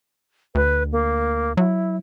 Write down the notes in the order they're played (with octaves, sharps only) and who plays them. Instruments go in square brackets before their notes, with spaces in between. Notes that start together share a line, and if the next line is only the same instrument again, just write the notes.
[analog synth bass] D2 [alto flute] B4
[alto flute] A#3
[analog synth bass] F#3 [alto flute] E4